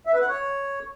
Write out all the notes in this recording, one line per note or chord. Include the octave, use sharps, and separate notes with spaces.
E5
B4
F#5
C#5